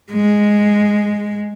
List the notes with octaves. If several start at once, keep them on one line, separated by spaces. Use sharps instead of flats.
G#3